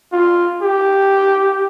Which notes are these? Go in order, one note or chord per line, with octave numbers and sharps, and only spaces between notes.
F4
G4